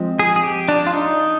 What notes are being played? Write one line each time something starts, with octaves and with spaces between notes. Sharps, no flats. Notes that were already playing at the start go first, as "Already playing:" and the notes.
Already playing: F3 G#3 C4
G#4
G#4
G4
D4
F4
D#4